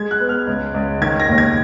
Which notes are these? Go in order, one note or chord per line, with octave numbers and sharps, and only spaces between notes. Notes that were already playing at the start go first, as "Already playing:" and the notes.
Already playing: G#3 G#6
F#6
B3
F6
C#2
C#2
D#3 G#6
A#6
D#2
G#6